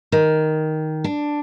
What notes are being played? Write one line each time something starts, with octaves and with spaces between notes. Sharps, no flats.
D#3
D4